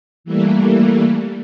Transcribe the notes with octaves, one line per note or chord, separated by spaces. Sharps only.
E3 G3 A3 A#3